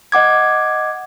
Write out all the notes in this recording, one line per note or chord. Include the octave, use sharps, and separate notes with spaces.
D#5 F#5 D6 G#6